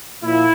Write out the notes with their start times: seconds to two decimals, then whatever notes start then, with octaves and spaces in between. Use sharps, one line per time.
0.24 A#2 F3 E4